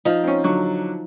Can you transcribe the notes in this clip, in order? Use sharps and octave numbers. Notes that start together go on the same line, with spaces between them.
F3 D#4
C4 C#4
D3 F#3 C#6